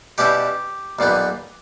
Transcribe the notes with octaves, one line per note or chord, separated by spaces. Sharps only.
B2 G3 C#4 E4 G4
B1 A#2 G3 B3